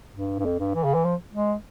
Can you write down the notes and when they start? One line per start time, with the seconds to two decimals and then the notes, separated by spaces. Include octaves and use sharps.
0.16 G2
0.39 G2
0.45 F2
0.60 G2
0.74 E3
0.84 C#3
0.94 E3
1.05 F3
1.33 G#3